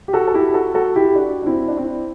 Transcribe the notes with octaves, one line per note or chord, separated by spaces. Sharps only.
G4
F#4 A4
A4
E4 G4
F#4 A4
F#4 A4
E4 G4
D4 F#4
D4
C4 E4
D4
C4 E4